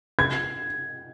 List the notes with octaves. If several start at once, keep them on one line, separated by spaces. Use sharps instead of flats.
G#6